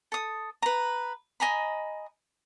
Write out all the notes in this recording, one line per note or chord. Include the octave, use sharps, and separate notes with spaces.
A4 D#6
B4 A#5
D#5 G#5 A#5 B5